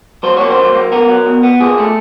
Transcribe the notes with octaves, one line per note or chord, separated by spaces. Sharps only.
F#3 C5
A#3 C#5
C5
F#3
A#3
B3 A#4
F#3
B2
B3
A#2 G#4
A3